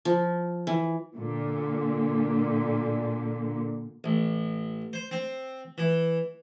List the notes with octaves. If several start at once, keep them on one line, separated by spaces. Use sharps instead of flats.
F3
E3
A#2 D3
A1
C5
C4
E3